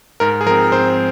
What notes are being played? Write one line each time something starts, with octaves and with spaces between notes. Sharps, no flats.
G#2 A#4
G#4
F3 C4 A#4
G#2 C4 C5